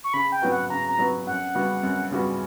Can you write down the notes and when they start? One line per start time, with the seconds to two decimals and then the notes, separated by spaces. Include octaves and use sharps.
0.04 C#6
0.14 C#3 B5
0.32 G5
0.42 F#3 B3 F#4 B4
0.52 F#5
0.70 C#3 A#5
0.88 A#5
0.99 F#3 B3 F#4 B4
1.27 F#2 F#5
1.55 C#3 G3 B3 F#4
1.83 F#2
2.11 C#3 G3 B3 F#4